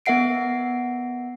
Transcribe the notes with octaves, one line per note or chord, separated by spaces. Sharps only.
B3 A#4 E5 F#5 C7 D7